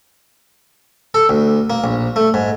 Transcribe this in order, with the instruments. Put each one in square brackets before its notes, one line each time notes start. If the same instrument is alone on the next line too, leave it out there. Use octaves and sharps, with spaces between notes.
[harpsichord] A4
D2
A#3
A#1
A3
G#2